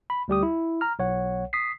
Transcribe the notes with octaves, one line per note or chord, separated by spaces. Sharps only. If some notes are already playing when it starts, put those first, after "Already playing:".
B5
D2 G3 G4 D#6
E4
A#5 F6
B1 C#5 F#5
D#6 B6 C7